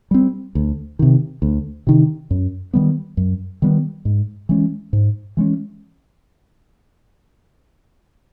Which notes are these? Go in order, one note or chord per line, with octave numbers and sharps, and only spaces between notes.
G3 C4
D2
C3 D#3
D2
C3 D#3
F#2
D#3 G3 B3
F#2
D#3 G3 B3
G#2
E3 G#3 C#4
G#2
E3 G#3 C#4